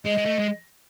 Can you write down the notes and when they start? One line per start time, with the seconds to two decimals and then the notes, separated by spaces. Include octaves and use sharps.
0.05 G#3 D#5
0.18 G#3
0.26 A3
0.39 G#3